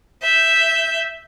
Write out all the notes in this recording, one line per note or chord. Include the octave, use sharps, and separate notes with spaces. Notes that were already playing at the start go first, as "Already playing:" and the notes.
E5 G6